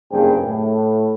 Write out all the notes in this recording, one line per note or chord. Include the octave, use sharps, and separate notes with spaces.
F#1 G2 A#3 C4 G#4 G5
A2